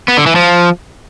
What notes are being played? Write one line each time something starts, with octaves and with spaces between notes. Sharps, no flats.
B3
D3
E3
F3